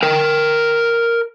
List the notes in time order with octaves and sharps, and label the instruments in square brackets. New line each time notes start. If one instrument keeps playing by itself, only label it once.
[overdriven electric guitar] A#4 G5